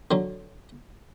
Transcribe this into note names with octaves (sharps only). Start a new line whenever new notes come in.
D3 F#3